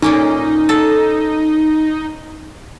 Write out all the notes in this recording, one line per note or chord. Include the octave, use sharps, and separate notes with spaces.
A#2 A#3 C#4 D#4
A4